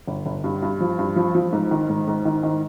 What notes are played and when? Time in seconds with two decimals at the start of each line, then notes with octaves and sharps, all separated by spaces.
0.07 G1
0.26 G1
0.44 G2
0.62 G2
0.80 F3
0.99 G2
1.16 F3
1.35 F3
1.53 G#2
1.71 D#3
1.89 G#2
2.08 G#2
2.25 D#3
2.43 D#3